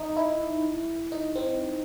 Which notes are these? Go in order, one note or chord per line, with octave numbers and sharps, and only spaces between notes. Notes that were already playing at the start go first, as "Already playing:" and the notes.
Already playing: D#4
E4
D#4
C4